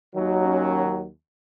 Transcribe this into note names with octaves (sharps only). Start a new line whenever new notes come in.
D#2 D#3 F#3
C#4